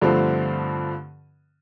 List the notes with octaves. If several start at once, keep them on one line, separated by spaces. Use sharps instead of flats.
G2 D3 F3 A3 C4